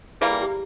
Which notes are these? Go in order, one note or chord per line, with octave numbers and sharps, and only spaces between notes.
E3 G3 A#3 G#4
G#4
E4
G4